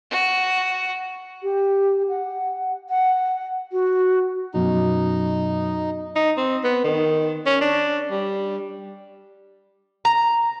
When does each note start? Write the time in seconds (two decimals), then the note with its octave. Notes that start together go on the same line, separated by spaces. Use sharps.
0.11 F#4
1.43 G4
2.09 F#5
2.89 F#5
3.72 F#4
4.54 F#2 B2 F#3 D#4
6.15 D#4
6.38 C4
6.64 B3
6.84 D#3
7.46 C#4
7.61 D4
8.11 G3
10.05 A#5